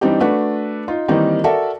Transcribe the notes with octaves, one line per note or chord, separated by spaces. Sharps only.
E3 G3 C4 D4 D#4 G4
A3 D4 F#4 B4
D#4 F4
D#3 E3 G3 A#3 C4 D#4
F#4 A4 A#4 D5 E5